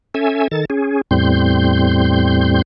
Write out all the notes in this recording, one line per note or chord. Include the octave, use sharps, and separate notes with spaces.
C#4 A4 E5 G#5
D#3 A4 A6
C#4 G#4
E2 A2 G3 C4 C6 G6